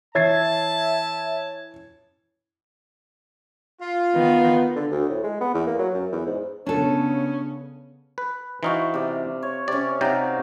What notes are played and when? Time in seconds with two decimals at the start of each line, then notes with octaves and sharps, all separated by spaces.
0.15 E3 C#5 E5 A5 G#6 A6 C7
3.81 F4
4.14 D#3 B3
4.76 D3
4.91 D2
5.09 A2
5.23 G#3
5.41 B3
5.54 E2
5.67 A#3
5.79 F#3
5.94 F#2
6.12 E2
6.26 G#2
6.66 C#3 B3 C#4 D4 A4
8.18 B4
8.63 E3 D#4 F#4 C5 F5 C#6
8.94 C3 D5
9.42 C#5
9.68 C3 C#4 D5
10.01 C3 D#4 F#4 D5 F5 G5